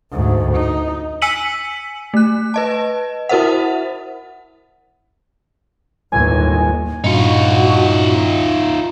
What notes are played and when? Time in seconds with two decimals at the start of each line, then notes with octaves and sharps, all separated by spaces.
0.11 D2 G#2
0.56 D#4
1.22 G#5 E6 B6 C#7 D#7 F#7
2.14 A3 F#6
2.54 B4 D#5 A5
3.29 E4 F#4 A#4 C5 E5 F#5
6.12 G1 D#2 A2 G#5
7.04 G2 A#2 D#4 F4 F#4 C#7